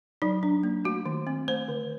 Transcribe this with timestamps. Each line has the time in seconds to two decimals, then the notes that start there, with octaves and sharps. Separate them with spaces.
0.22 F#3 D#4
0.43 D4
0.63 A#3
0.85 A3 F#4
1.06 D#3
1.27 C4
1.48 A3 C5
1.68 D3